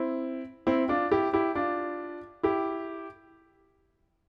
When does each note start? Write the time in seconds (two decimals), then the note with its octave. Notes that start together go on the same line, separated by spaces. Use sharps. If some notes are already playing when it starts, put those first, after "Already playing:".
Already playing: C4 E4
0.67 C4 E4
0.89 D4 F4
1.11 E4 G4
1.33 E4 G4
1.55 D4 F4
2.43 E4 G4